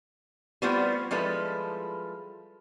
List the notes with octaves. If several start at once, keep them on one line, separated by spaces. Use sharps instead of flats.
G3 A3 B3 C4 E4 F4
F3 G3 G#3 E4 A4 B4